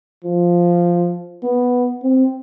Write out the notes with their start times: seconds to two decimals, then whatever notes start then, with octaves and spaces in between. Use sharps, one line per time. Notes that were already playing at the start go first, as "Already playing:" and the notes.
0.24 F3
1.43 B3
2.03 C4